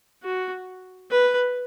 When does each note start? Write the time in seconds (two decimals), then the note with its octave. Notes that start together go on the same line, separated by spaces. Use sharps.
0.24 F#4
1.10 B4